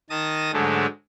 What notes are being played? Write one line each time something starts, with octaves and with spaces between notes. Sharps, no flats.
D#3 A5 D#6 A#6
G#2 D3 F#3 G#3 A3